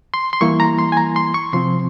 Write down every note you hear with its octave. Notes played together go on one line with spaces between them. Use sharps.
C6
C6
E3 G3 A#3 E4 C#6
A#5
C6
G#5
A#5
C6
C#6
C3 F3 C4 C6